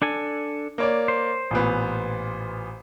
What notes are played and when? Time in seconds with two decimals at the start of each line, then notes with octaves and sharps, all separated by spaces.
0.02 D4 A4 G#5
0.78 A#3 C#5 D5
1.08 C5
1.51 A1 A#2 B3